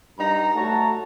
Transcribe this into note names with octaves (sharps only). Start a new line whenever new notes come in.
G2 G3 D#4 A#5
A3 F#4 C#5 F#5 A5 A#5